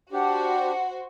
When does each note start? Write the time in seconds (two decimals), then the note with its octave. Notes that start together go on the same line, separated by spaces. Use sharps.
0.13 D4 F#4 G4 C5 F#5